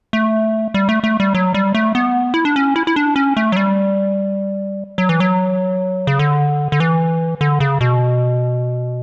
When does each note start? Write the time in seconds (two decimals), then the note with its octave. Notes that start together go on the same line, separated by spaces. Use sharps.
0.13 A3
0.74 G3
0.89 A3
1.04 A3
1.20 G3
1.35 F#3
1.54 G3
1.75 A3
1.95 B3
2.34 E4
2.45 D4
2.56 C#4
2.76 E4
2.87 E4
2.96 D4
3.16 C#4
3.37 A3
3.52 F#3
3.56 G3
4.98 F#3
5.09 E3
5.20 F#3
6.07 C#3
6.19 D3
6.72 D3
6.80 E3
7.41 D3
7.60 C#3
7.81 B2